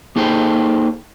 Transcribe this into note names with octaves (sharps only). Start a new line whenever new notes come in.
A#3 D#4 G#4 A4 C5 G5